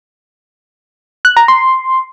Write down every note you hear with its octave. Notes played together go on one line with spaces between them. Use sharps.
F#6
A#5
C6